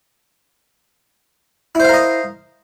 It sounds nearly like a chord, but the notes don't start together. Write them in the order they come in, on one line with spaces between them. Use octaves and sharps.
E4 C5 F5 A#4 D#5